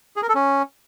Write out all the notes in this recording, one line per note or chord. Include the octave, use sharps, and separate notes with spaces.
G#4
A#4
A4
C#4